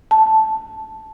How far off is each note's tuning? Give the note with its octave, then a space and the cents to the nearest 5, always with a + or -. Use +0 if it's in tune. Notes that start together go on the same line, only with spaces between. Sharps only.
A5 -5